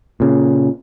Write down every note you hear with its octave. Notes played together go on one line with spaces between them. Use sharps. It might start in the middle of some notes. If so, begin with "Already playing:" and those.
A#2 C#3